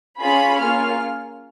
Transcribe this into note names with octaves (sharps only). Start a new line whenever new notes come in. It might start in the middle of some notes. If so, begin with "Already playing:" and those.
C#4 F4 G#4 B5
A#3 C#4 F4 G#4 F6